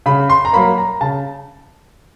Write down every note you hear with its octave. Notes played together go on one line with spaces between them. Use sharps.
C#3 B5
C6
A#5
F#3 A#3 B5
A#5
C#3 A5